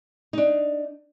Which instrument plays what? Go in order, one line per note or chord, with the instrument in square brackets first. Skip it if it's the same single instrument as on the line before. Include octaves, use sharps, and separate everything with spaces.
[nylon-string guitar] D4 D#4